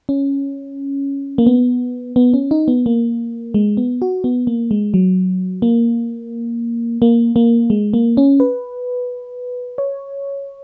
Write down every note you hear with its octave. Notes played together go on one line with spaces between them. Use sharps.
C#4
A#3
B3
B3
C#4
D#4
B3
A#3
G#3
B3
F#4
B3
A#3
G#3
F#3
A#3
A#3
A#3
G#3
A#3
C#4
B4
C#5